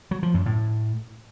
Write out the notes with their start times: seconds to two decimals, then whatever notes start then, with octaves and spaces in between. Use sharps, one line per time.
0.11 F#3
0.23 F3
0.34 F#2
0.46 A2